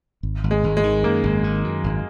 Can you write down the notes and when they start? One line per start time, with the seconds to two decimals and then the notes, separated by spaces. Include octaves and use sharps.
0.23 G#1
0.44 G#1
0.51 G#3
0.64 G#1
0.77 G#3
0.84 D#3
1.04 F#2 A#3
1.23 G#1
1.44 D#3
1.64 F#2
1.84 G#1